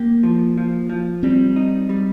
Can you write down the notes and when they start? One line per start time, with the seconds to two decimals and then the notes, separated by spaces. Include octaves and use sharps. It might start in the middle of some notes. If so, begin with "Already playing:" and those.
Already playing: A#3 G4
0.23 F3
0.57 F3
0.90 F3
1.23 G3 C4
1.56 D#4
1.89 G3